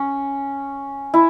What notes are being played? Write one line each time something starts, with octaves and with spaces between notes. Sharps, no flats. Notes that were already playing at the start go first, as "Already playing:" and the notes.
Already playing: C#4
E4